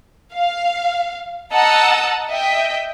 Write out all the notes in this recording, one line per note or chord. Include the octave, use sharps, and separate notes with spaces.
F5
D#5 F#5 A5 A#5 E6
D#5 E5 G5